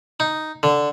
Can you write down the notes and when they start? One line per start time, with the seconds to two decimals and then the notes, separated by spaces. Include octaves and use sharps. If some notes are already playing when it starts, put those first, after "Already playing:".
0.20 D#4
0.63 D3